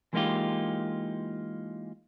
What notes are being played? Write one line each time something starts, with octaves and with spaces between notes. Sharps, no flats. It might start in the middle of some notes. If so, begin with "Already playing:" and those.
E3 G#3 A#3 D#4 F4 G4